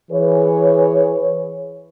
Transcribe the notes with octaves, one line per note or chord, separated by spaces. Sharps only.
E3 G#4 B4 C#5